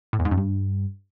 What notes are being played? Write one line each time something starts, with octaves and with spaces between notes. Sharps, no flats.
A2
E2
G#2
F#2
G2